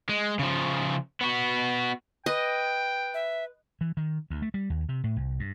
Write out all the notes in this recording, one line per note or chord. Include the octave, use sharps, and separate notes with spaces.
G#3
C#3 F3
B3 F#4
B4 D#5 G5
E5
E3
D#3
D2
A3
G3
D#2
C3
A2
C2
G2